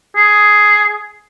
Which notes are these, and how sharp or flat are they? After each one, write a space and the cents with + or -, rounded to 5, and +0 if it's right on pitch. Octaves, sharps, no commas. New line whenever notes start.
G#4 +5